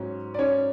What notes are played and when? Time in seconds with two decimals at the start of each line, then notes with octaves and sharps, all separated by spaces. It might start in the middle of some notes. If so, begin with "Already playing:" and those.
Already playing: G#2 F#3 C#4
0.34 D5
0.39 C#4 C#5